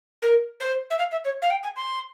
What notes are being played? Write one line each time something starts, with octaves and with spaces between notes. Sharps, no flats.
A#4
C5
E5
F5
E5
C#5
F5
G5
G#5
C6